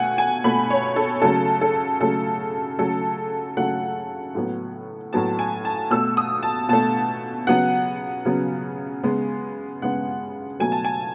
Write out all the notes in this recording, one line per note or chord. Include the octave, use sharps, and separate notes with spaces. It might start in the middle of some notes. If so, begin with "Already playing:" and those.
Already playing: B2 A3 F#5 G#5
G#5
B2 A3 B5
C#5
A4
C#3 F#3 A3 A4
A4
C#3 F#3 A3 A4
C#3 F#3 A3 A4
C#3 F#3 A3 F#5
A2 F#3 B3
A2 F#3 B3 A5
G#5
A5
B2 A3 E6
D#6
A5
B2 A3 A5
C#3 F#3 B3 F#5
C#3 F#3 B3
C#3 G#3 B3
C#3 G#3 B3 F#5
B2 F#3 A3 G#5
A5
G#5